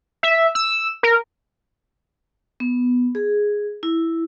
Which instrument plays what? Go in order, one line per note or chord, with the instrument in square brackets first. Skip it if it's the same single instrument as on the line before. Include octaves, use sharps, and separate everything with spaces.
[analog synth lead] E5
E6
A#4
[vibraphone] B3
G#4
E4